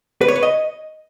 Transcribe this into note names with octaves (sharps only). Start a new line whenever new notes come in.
B4
C#5
B4
D#5